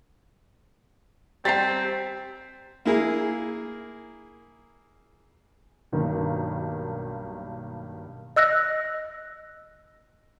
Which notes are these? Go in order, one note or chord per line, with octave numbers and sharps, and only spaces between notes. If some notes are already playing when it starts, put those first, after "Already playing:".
G3 C4 A#5 A6 B6 C7
A#3 E4 G#4 A#4
B1 G2 D#3 A#3
D#5 E6 F#6 A#6